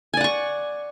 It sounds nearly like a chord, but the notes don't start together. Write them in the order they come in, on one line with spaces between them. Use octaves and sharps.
G#5 D5 F#5 C#6